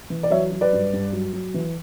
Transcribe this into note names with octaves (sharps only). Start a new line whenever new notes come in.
E3
D5
F#3 C#5 E5
F#3
B4 D5
G2
G2
F#3
F#3
E3